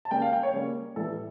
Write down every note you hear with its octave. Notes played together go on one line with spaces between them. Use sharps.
A5
C#3 G3 A#3 G5
F5
G5
C#5
C#3 G3 A#3
A2 E3 G3 A4